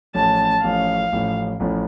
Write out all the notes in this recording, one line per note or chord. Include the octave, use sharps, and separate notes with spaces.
A1 A2 F3 C#4 A5
A1 A2 F3 C#4 F5
A1 A2 F3 C#4
A1 A2 F3 C#4